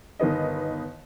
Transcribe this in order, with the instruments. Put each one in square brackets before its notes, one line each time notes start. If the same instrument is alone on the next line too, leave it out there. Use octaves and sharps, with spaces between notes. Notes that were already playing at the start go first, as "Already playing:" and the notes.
[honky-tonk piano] G1 D#3 B3 D#5